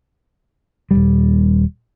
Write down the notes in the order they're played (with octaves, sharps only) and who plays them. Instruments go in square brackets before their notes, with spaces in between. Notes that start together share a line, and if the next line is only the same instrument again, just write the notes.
[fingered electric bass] D#1 C#2 G3